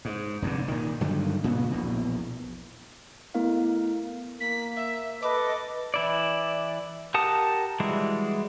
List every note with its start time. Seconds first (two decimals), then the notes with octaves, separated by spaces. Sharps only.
0.05 G#2
0.42 F1 G2 A#2 D3
0.68 A#2 D#3
1.01 G2 D3 D#3 F#3
1.44 A#2 C#3 A#3 B3
1.71 A#1 E2 B2
3.34 A3 B3 E4 A#4 F5
4.40 A#3 B6
4.76 E5
5.22 A4 B4 D#5 A5 D6
5.94 E3 E4 D5
7.14 G4 A#4 F#5 A5 D#6
7.80 E3 G3 G#3 E4 F#4